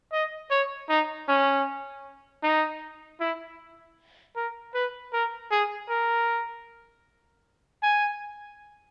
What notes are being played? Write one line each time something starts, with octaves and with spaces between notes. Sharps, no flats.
D#5
C#5
D#4
C#4
D#4
E4
A#4
B4
A#4
G#4
A#4
G#5